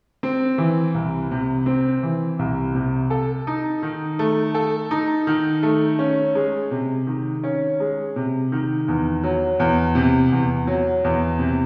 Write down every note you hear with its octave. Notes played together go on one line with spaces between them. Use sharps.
C4
E3
C2
C3
C4
E3
C2
C3
A4
D#4
D#3
A3
A4
D#4
D#3
A3
C#4
G#3
C3
D#3
C#4
G#3
C3
D#3
E2
F#3
E2
C3
E2
F#3
E2
C3